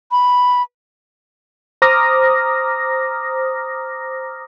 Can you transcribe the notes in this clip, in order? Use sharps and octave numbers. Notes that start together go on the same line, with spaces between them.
B5
C5 A#5 D6 D#6 F6 A#6